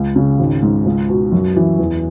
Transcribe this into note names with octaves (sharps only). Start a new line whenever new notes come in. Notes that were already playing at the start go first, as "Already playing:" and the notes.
Already playing: C#2
C#3
G#1
G#2
C#2
B2
F#2
E3
E2